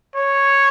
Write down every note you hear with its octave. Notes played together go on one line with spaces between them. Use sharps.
C#5